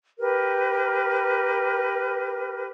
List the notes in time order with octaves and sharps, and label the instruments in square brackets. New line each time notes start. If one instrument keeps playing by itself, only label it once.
[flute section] G4 A#4 B4